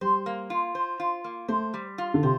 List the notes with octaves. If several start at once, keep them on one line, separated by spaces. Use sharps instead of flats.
G3 C5
A#3
F4
C5
F4
A#3
A3 C5
G3
F4
D3
C3 C5